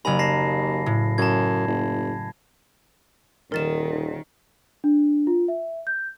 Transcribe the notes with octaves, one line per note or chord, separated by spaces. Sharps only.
F#1 D#2 G#5 A#5 B5
A5 A#6 C7
A2
F#2 A5 G#6
F#1
D#1 D#3 A#4 A6 E7
D4
F4
E5
G6